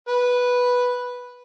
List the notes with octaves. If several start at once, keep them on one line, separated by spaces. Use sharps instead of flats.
B4